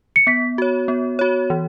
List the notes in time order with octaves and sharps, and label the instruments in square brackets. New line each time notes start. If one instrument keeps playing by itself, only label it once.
[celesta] C#7
[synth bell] B3 [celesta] B6
[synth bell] F#4 C#5
B3
F#4 C#5
E3